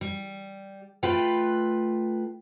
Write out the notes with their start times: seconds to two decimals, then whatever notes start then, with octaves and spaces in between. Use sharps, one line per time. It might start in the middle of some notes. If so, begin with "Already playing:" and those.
0.01 G3
1.03 A3 F4 B4 G5